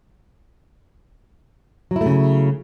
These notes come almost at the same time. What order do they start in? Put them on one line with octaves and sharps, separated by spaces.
F#3 E4 A3 C#3